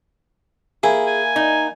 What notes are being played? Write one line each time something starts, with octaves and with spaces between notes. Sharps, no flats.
A#3 E4 G#4
G#5
D#4